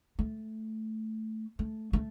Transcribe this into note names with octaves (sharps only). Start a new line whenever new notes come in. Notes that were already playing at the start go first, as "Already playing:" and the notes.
A3
A3
A3